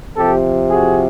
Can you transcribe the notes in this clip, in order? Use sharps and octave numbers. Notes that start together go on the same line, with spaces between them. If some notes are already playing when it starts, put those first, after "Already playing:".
C3 F3 G4 A4
F#4 G#4